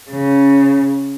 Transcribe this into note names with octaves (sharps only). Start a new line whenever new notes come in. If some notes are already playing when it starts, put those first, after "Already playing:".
C#3